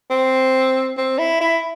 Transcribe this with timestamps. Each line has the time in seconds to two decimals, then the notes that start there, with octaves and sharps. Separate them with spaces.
0.10 C4
0.97 C4
1.19 E4
1.41 E4